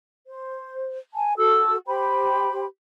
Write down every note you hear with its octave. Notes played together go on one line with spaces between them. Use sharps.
C5
G#5 A5
F#4 A4 E6
G4 C5 G5 B5